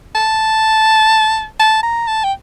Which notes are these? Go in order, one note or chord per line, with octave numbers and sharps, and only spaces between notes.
A5
A5
A#5
A5
G5